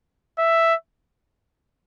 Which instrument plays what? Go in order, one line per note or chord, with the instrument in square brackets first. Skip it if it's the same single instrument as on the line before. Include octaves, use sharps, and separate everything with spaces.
[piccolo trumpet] E5